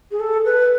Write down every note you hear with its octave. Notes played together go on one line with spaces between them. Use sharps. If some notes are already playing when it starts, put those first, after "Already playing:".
G#4
A4
B4